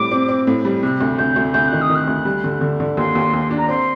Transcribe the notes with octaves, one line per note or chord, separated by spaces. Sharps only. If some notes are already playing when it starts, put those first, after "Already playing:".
Already playing: A2 G3 C4 D6
C4
C4
A2
G3
C3 F#6
D2
D2 G6
D2
D2 G6
D#3 F#6
D#6
D#3
F#6
D2
G3
D3
D3
D3
D#2 C6
D#2
D#2
D4
A#5
C4 C6